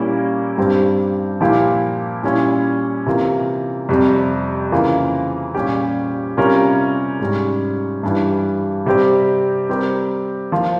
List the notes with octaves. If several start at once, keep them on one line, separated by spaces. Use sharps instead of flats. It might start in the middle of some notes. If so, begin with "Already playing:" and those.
Already playing: A#2 G3 A#3 C#4 E4
G2 G3 C4 G4
A#2 F3 A#3 E4 G4
A#2 G3 C#4 E4
C3 E3 A#3 F4 A#4
F2 C3 G3
C#3 E3 A#3 F4 A#4
A#2 G3 C#4 G4
C3 G3 C#4 F4 A#4
G#2 G3 C#4
G2 E3 G3
C3 G3 C4 G4
G3 C4 G4 A#4
F3 A#3 F4